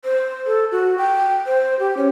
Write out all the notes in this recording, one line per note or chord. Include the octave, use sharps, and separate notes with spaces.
C5
A4
F#4
G5
C5
G4
C#4